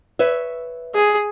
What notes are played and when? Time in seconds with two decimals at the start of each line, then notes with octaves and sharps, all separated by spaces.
0.19 B4 C#5 E5
0.95 G#4